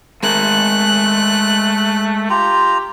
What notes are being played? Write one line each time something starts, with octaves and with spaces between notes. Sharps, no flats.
G#3 A3 A#4 F#6
F4 G4 A#5